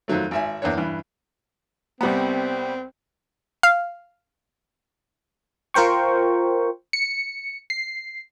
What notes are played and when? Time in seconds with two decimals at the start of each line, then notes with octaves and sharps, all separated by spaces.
0.08 F2 D#3 F#3 A3
0.31 G#1 E5 G#5
0.62 E2 A#3 D4 C#5
0.77 G2 E3
2.01 C2 G3 B3 C4
3.63 F5
5.74 F4 A#4 C5 G5 C#6
6.93 C#7
7.70 C7